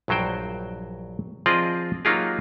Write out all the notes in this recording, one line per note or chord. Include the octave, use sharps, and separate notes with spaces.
A#1 G2 F#3 C5 G5
F3 C4 F4 G#4 D5 D#5
F#3 A#3 D#4 F4 G4 G#4